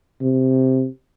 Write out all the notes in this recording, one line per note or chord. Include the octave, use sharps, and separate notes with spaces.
C3